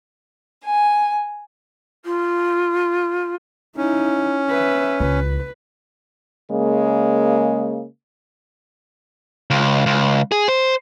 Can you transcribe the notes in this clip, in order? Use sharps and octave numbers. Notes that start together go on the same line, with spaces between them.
G#5
F4
C#4 D#4 E4
B4 E5
C#2 B4
C#3 G#3 A#3
C#2
C#2
G#4
C5